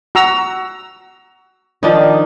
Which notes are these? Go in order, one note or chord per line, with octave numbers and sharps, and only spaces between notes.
F#4 A#5 E6
D#3 F3 D4 D#4